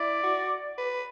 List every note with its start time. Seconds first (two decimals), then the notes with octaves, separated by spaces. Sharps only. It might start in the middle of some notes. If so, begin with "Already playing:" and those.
Already playing: E4 D5
0.23 F#4
0.78 B4